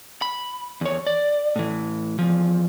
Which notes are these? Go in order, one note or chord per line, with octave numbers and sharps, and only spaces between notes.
B5
E2 C#5
D5
A2 E3
E2 F3